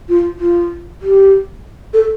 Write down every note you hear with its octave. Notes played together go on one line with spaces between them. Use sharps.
F4
F4
G4
A4